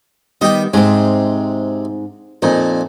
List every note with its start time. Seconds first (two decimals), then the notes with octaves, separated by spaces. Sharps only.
0.41 D#3 G3 B3 G4 D#5
0.74 G#2 C3 G#3 C4
2.42 F2 A#2 D#4